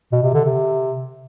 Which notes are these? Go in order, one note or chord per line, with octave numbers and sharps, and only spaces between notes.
B2
C3
D3
C3